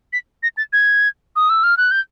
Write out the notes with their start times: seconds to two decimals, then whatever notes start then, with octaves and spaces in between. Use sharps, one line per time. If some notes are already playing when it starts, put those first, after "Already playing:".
0.13 B6
0.43 A#6
0.57 A6
0.73 G#6
1.36 D#6
1.50 E6
1.63 F6
1.77 F#6
1.91 G6